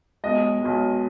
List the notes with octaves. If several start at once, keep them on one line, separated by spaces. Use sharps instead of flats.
B1 B2 G#3 D#5
B1 B2 G#3